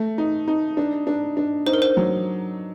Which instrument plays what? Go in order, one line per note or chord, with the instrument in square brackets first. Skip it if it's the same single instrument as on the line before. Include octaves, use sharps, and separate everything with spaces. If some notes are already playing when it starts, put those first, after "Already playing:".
Already playing: [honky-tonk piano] A3
D#4
D#4
D4
D4
D4
[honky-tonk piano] D#4 [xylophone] C5
[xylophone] A#4
C5
[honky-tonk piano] F#3